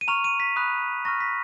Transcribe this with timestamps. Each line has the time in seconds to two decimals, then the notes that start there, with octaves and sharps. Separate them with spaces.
0.01 D#7
0.08 A#5 C#6 F6 F7
0.24 D#7
0.40 B6
0.56 B5 D#6 F#6
1.05 A#5 C#6 F6 A#6
1.20 B6